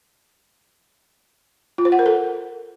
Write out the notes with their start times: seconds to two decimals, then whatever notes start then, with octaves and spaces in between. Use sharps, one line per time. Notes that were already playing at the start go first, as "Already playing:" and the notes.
1.78 F4
1.85 C5
1.92 F#5
1.99 A#4
2.06 A4